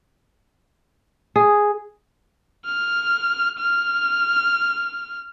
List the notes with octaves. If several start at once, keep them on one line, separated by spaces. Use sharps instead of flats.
G#4
F6
F6